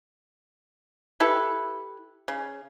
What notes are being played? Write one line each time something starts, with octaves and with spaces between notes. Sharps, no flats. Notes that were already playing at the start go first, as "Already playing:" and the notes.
E4 G4 A4 B4
C#3